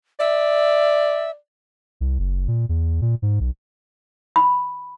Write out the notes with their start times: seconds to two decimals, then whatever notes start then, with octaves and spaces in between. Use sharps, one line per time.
0.20 D5 E5
2.01 C2
2.19 F#1
2.48 A#2
2.69 E2
3.02 A#2
3.22 G#2
3.40 B1
4.36 B5